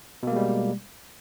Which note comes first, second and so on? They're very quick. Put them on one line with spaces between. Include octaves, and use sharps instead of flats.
B2 A#3 G#3 G3